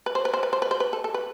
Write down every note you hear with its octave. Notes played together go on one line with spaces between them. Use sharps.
B4
C5
B4
C5
B4
C5
B4
C5
B4
A4
A4
B4